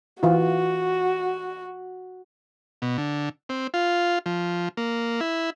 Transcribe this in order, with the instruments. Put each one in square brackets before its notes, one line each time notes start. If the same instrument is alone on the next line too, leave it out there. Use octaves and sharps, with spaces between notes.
[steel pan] E3 F4 [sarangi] F#4
[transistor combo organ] B2
D3
C4
F4
F3
A#3
E4